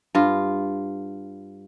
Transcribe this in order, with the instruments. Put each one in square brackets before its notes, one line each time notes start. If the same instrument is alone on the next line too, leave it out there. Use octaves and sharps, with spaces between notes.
[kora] G2 F4